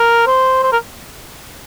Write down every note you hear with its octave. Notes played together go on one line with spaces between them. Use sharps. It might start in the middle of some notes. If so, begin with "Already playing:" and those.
Already playing: A#4
C5
C5
A#4